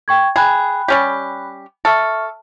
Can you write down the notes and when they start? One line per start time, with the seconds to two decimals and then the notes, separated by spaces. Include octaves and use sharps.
0.08 G5 C#6 G#6
0.36 G#4 G5 B5 F#6
0.88 G3 C#4 G4
1.85 A4 E5 C#6 F6